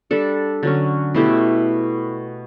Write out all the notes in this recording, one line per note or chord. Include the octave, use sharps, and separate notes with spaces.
G3 D4 A4
D3 F#3 C#4
B2 A3 E4 G4